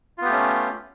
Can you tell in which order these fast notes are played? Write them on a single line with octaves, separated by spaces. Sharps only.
F4 B3 G4 A3 C#4